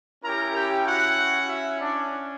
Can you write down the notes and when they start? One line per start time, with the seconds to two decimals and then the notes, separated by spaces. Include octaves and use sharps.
0.24 C#4 E4 G4 A#4 A#5
0.55 G4 G5
0.85 F#4 F#5
1.47 E4 E5
1.79 D4 D5